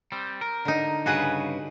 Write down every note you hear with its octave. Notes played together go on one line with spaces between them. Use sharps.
G3 C4
A#4
D3 D#4
G2 C#3 F#4 G#4 B4 F#5